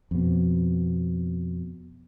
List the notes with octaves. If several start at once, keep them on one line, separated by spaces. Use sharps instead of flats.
F2 B2